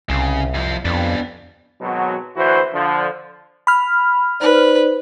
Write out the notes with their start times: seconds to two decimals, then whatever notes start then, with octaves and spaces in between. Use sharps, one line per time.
0.10 C2 C#3
0.54 F2 F3
0.85 F2 B3 D4
1.81 G#1 B2 F#3
2.36 D2 E3 E4 F#4 C5
2.73 D3 F3
3.67 B5 F6
4.40 D#4 B4 C5 D5